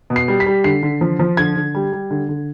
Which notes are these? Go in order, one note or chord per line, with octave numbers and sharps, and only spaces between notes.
B2
C7
G3
B6
G3
D3 C7
D3
F3
F3
D3 G#6
D3
G3
G3
D3
D3